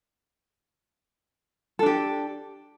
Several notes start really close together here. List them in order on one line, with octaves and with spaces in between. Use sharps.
A4 D4 G4